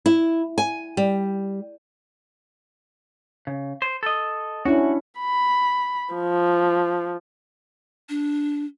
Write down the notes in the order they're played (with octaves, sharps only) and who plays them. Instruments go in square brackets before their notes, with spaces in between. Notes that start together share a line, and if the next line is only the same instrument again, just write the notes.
[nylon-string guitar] E4
G#5
G3
[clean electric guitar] C#3
C5
A4 D#5
[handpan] C#4 D4 E4 [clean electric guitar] F#4
[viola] B5
F3
[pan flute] D4